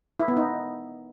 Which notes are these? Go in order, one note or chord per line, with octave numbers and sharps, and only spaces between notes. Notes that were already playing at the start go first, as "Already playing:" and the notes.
E4
B3
D#4